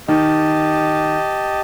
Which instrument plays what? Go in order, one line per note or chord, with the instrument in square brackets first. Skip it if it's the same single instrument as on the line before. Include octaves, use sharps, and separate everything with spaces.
[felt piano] D#3 [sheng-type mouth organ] G4 D#5 A5